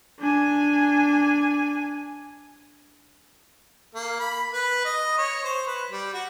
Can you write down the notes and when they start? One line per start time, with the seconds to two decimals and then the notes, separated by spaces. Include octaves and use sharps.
0.20 D4 G#5
3.94 A#3
4.20 B5
4.52 B4
4.85 D#5
5.18 C#5
5.44 C5
5.67 B4
5.91 G3
6.13 F#4